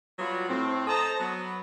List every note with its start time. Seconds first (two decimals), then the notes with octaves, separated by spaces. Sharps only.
0.19 F#3 G3 B3 F4 F#4
0.49 A2 C4
0.87 A4 C5 D#5 A5 A#5
1.19 F#3 B3